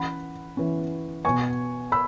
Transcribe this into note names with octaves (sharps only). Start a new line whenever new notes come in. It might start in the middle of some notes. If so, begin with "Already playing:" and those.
Already playing: E3 C#4 F#5 B5
E3 C#4
B2 B3 G#5 C#6
B5 E6